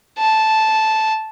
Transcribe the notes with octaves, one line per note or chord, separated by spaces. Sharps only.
A5